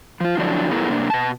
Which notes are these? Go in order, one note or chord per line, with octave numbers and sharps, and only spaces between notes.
F3 F4
D3 F3 F#3 D4 E4
B2 A3 B3 E4 G#4 A#4
C3 A#3 D4
B2 A5